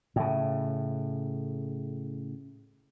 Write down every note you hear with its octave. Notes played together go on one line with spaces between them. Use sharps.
A2 C#3